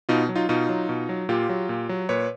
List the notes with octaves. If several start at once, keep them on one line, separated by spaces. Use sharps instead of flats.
B2 D#4 F4
F#3
D#4 F4
B2 D#4 F4
F#3
B2
F#3
A#2 F4 G4
F#3
A#2
F#3
A#2 B4 C#5